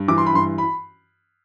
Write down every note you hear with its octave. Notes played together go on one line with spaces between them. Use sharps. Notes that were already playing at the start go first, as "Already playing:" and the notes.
Already playing: G2
E3 D6
C6
B5
G2 C6
B5